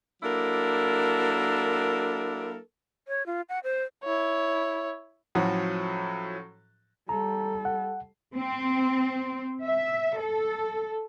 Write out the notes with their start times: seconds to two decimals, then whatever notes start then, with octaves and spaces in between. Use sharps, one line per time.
0.23 F#3 A#3 D4 E4 A4 A#4
3.08 C#5
3.26 F4
3.49 F#5
3.64 C5
4.04 E4 C#5
5.35 A2 F3 F#3 C#4 F#4
7.09 G3 A4 A#5
7.65 F#5
8.35 C4
9.66 E5
10.19 A4